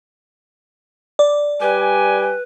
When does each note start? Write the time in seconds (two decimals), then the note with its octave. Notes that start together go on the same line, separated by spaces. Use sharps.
1.19 D5
1.61 G3 G4 B4 G#5